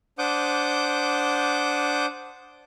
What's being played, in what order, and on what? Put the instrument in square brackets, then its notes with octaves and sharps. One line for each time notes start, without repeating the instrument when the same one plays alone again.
[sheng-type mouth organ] D4 C5 F#5 D6 D#6 G6